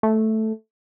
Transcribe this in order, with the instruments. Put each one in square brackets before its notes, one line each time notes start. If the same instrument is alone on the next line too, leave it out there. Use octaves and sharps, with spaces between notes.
[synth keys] A3